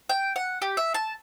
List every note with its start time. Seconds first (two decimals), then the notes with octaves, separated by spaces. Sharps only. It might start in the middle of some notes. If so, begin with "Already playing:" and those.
0.09 G5
0.36 F#5
0.62 G4
0.77 E5
0.94 A5